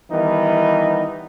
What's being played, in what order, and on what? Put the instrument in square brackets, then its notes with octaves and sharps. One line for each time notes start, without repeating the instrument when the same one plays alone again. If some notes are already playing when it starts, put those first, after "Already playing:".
[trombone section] D#3 E3 G3 B3 D#4